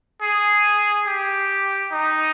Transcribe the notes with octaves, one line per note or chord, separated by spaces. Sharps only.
G#4
G4
D#4